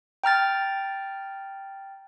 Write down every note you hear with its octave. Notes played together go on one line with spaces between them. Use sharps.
G5 A#5 F6 A6